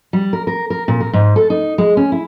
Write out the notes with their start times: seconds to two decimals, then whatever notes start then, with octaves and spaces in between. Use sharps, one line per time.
0.13 G3
0.33 A#4
0.47 A#4
0.70 A#4
0.88 A#2
1.00 A#4
1.13 G#2
1.36 A4
1.50 D#4
1.78 G#3
1.97 C#4
2.12 E4